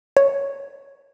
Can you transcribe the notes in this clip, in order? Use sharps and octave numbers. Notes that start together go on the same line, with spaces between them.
C#5